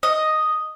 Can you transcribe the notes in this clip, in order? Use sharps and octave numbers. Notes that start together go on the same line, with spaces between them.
D#5